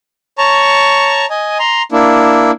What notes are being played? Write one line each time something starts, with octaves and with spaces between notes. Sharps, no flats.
C#5 A5 A#5 C#6
D#5 G#5
A#5 C6
A#3 D4 E4